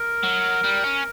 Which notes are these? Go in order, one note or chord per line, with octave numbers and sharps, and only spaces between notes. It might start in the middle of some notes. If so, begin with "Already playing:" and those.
Already playing: A#4
F#3
G3
C#4